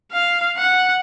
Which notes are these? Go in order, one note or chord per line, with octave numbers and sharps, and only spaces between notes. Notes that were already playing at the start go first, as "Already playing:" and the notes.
F5
F#5